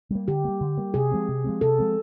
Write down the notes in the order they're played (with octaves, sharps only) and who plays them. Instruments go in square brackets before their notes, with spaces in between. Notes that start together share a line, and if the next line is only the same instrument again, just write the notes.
[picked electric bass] G3 A#3
[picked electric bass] D3 [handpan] G4
[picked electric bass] G3 A#3
D3
G3 A#3
[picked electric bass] C3 [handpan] G#4
[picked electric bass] F3 G#3 C4
C3
F3 G#3 C4
[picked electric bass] C3 [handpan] A4
[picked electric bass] F3 G#3 C4